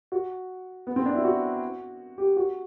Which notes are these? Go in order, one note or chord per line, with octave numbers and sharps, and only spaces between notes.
F#4
B3
C4
D4
E4
F#4
G4
F#4